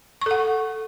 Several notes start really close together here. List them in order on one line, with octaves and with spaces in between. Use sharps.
C#6 A4 F#5